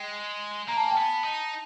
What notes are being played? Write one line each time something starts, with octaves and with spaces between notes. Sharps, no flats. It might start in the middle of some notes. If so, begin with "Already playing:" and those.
Already playing: G#3 G5
A#3 A#5
A5
G#5
G5 A5
B3
D#4